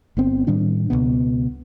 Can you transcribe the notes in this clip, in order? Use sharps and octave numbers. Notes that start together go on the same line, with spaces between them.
G1 B3 C4
A2 D#3 G3 D4
C#2 F#2 B2 B3